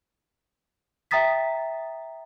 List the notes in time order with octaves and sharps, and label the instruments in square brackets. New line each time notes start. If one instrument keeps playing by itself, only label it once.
[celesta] E5 G5 A#5 D#6 A6 B6